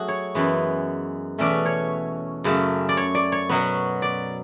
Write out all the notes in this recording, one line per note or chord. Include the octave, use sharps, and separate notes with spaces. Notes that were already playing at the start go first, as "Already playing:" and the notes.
Already playing: F#3 A3 F#4 G#4
C#5
F#2 E3 G#3 B3
E2 B2 A3 C#4 D5
C#5
F#2 C#3 F#3 A3
D5
C#5
D5
C#5
B2 F#3 B3
D5